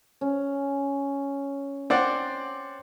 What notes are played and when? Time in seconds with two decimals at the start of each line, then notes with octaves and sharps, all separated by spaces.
0.21 C#4
1.90 C4 D5 F#5